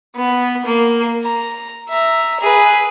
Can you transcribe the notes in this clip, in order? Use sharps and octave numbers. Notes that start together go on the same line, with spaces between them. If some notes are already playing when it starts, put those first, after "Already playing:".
B3
A#3
A#5
E5 A#5
G#4 B4